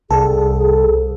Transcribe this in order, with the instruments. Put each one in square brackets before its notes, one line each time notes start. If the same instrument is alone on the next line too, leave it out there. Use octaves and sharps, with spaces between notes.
[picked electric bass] C2 [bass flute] G#4 [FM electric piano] A4